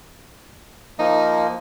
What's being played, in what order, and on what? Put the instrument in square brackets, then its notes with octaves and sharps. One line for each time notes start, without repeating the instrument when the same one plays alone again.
[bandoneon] F3 A#3 [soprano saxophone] D#4